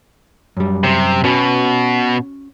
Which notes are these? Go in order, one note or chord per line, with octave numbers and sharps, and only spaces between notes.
F#2 G3
C3
B2 C#4 F#4 C#5